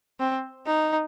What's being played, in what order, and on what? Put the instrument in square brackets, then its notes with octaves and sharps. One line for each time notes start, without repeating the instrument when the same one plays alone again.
[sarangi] C4
D#4